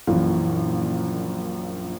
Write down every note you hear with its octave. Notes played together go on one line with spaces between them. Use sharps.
A#1 F#2 A#2 E3